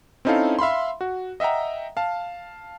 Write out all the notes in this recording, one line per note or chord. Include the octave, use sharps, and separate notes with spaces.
C4 C#4 D#4 E4 A4 F5
E5 F5 B5 C6
F#4
D#5 E5 F#5 G5 A#5
F5 A5